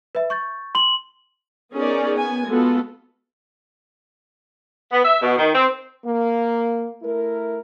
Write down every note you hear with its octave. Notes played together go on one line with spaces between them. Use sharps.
B4 E5
C#6 G6 A6
C6 F#7
B3 C#4 D#4 G#4 A#4 D5
B3 G#5
G#3 B3 F4 F#4 A4
B3
E5
B2
D#3
C4
A#3
A3 E4 A#4